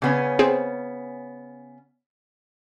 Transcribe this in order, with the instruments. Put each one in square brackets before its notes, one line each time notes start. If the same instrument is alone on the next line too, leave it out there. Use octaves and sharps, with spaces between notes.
[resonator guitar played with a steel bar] C#3 B3 C#4
[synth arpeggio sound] C4 G#4